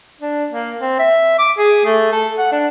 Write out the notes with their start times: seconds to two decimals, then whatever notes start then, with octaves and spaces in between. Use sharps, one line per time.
0.21 D4
0.51 A#3
0.80 C4
0.99 E5
1.39 D6
1.58 G#4
1.85 A3
2.12 A4
2.38 F#5
2.52 D4